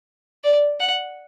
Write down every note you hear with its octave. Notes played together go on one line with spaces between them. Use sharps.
D5
F#5